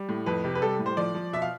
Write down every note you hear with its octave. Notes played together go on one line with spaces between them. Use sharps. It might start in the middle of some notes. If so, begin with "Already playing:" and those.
Already playing: G3
A2
F2 B4
C3
B4
G3 A4
A2
C5
F3 D5
F3
B2 E5
F5